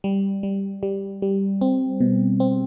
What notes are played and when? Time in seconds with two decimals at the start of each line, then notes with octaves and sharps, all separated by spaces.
0.04 G3
0.43 G3
0.83 G3
1.22 G3
1.61 C4
2.00 B2
2.40 C4